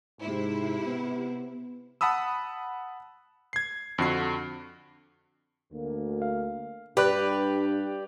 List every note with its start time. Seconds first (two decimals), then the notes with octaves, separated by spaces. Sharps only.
0.21 G#2 C3 E4
0.86 B3
2.01 F#5 A5 B5 D#6 E6
3.53 G#6 C7
3.98 F2 D3 F#4 C7
5.73 D2 A#3
6.22 F5
6.97 G2 G4 B4 D5 F#6